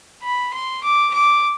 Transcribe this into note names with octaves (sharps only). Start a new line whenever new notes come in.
B5
C6
D6
D6